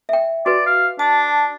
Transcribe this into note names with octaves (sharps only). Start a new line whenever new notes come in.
E5 G5
F#4 B4 D5
F5
D4 A5